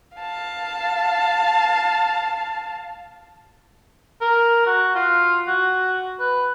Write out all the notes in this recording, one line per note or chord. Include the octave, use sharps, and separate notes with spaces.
F5 A5
A#4
F#4
F4
F#4
B4